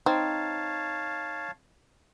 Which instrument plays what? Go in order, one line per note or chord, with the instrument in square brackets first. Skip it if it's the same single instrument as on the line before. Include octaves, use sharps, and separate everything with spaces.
[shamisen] C4 [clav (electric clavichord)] D#4 [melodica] C#5 F5 A5